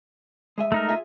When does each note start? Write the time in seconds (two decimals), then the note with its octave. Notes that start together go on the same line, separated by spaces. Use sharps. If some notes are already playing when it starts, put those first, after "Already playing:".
0.58 G#3 G#4 E5
0.72 A3 D#4 A#4
0.89 F4 G#4 E5